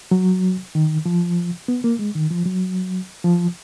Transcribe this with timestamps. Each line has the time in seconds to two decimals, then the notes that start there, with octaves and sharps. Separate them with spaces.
0.11 F#3
0.75 D#3
1.06 F3
1.68 B3
1.84 A#3
1.99 G#3
2.15 D#3
2.31 F3
2.46 F#3
3.24 F3